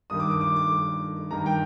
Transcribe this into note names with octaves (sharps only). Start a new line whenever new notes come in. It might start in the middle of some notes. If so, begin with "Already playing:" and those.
G2 D#3 D#6
D6
D6
D6
D6
G2 D#3 A#5
G5